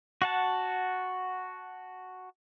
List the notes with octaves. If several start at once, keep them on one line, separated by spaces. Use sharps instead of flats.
F#4 F#5 A5